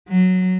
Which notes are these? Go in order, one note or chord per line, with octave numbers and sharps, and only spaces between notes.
F#3